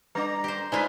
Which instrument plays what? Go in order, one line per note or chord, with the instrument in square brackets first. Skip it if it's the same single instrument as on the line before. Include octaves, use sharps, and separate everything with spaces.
[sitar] G3 D4 [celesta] B4 D6 [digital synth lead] A#5
[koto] G4 C5
[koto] G#3 A3 F4 [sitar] D#4 B4 [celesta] C5 D5 [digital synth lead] G#5